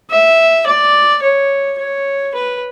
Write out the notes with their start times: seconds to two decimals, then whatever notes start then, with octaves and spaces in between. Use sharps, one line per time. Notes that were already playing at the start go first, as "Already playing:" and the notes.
0.10 E5
0.66 D5
1.22 C#5
1.79 C#5
2.34 B4